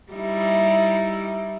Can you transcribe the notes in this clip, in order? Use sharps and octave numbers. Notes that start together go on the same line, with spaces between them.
G3 D#4 E4